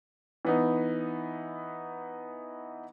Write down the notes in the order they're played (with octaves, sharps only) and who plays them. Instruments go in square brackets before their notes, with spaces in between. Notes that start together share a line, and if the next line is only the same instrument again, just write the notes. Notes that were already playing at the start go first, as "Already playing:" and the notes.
[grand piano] E3 B3 D#4